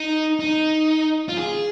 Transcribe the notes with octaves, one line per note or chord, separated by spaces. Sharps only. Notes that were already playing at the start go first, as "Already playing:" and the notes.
Already playing: D#4
D#4
F4
G#4